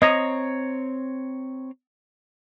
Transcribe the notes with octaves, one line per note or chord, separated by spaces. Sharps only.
C4 C#5 D#5 A#5